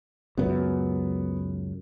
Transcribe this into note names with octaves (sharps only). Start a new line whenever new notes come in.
C#2 F#2 B3